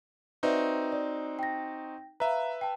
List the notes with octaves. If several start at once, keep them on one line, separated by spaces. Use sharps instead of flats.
C4 D#4 F#4 B4 D5 E5
D5
G5 A#6
B4 E5 F5 A#5
G5 A5